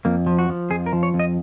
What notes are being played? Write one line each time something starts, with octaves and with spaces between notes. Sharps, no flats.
F2 A#3
F3
F#4
F3
F2 G#4
A#4
F3
C#5
F2
D#5